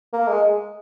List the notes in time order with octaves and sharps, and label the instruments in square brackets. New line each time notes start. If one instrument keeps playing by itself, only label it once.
[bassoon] A#3
G#3